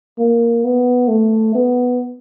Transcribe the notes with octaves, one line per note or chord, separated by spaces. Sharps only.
A#3
B3
A3
B3